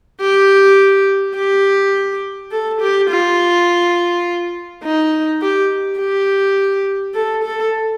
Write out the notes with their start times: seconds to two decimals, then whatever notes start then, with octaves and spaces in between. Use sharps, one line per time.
0.21 G4
1.36 G4
2.51 A4
2.81 G4
3.10 F4
4.84 D#4
5.42 G4
5.99 G4
7.14 A4
7.44 A4